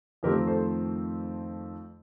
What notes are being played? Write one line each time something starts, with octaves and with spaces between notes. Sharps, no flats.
F2 D#3 A3 C4 G4 A#4
A4 C5